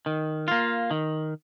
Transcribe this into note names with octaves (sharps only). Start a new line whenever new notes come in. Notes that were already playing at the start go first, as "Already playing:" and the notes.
D#3
A#3 F4
D#3